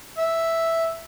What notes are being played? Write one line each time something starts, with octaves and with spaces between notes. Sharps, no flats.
E5